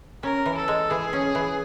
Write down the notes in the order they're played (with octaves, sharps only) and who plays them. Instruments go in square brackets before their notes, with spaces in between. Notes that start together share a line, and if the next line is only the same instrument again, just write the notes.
[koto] C#4 [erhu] A#4
[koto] E3
[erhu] A4
[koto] G#3
[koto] E3 [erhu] G#4
[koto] C#4
E3